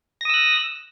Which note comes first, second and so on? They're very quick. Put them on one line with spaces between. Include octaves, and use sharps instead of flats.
A#6 D#6 E6 F#6